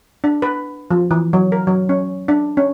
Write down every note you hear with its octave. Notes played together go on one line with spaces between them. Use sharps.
D4
B4
F3
E3
F#3
A#4
F#3
C#4
D4
C#4